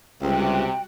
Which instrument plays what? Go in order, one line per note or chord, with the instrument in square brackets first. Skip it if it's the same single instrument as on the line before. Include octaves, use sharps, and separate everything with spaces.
[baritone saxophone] C#2 [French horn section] C3 [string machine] G3 F#4 F#5 [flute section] G5